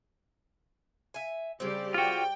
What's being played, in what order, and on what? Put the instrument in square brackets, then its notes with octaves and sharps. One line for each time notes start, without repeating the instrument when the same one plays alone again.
[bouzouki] E5 G#5
[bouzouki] C#3 C4 [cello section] G3 G4 D5
[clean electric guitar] F4 F#4 [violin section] G5